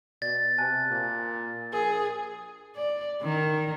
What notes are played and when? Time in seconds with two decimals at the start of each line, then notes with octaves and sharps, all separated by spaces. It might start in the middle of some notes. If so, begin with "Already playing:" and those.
0.22 B2 D5 A6
0.58 C3 G#5 A5 F#6
0.91 A#2
1.73 A#1 G#4 A#4
2.76 D5
3.23 D#3